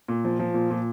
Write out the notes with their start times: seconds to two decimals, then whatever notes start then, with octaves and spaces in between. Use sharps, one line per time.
0.08 A#2
0.25 F3
0.39 F3
0.54 A#2
0.70 A#2